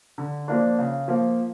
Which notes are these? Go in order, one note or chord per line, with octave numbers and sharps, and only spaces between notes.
D3
F3 A#3 D4
C#3
F3 A#3